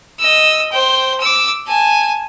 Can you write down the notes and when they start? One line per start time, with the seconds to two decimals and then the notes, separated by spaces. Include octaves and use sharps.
0.20 D#5 E6
0.72 C5 G5
1.21 D6 E6
1.67 G#5 A5